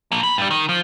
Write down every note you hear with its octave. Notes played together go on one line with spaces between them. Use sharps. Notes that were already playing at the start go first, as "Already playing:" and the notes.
F3 A#3
B2 B5
G2 G3
D#3
F3